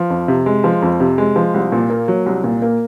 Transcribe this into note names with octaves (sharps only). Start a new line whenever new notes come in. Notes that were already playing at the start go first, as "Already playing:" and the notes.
Already playing: F3
F2
C3
G#3
F3
F2
C3
G#3
F3
C2
A#2
A#3
F#3
C2
A#2
A#3